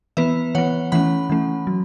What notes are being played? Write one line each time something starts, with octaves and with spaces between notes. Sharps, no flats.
E3 B3 B4 E5
E3 B3 C#5 F#5
E3 A3 C#4 F#5 B5
E3 A3 C#4
F#3